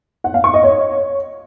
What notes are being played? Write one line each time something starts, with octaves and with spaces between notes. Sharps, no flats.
F#5
F5
C#6
D#5
C#5